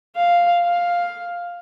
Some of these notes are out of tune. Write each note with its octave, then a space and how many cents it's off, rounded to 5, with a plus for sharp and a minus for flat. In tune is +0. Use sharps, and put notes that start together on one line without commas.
F5 +0
F5 +5